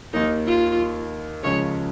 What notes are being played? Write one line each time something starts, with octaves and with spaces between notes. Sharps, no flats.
D#2 D#3 A#3 D#4
F4
C#2 C#3 F3 C#4 C#5